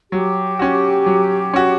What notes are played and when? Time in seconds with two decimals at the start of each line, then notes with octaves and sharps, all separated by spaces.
0.12 F#3 G4
0.59 C#4 F#4
1.06 F#3
1.54 C#4 F#4